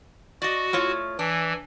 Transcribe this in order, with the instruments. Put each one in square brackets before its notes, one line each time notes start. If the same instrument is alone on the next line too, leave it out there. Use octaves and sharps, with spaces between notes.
[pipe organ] F#4 [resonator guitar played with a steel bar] D5 D#5
[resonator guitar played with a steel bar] A2 F4 C#5
[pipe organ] E3 [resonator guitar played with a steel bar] D4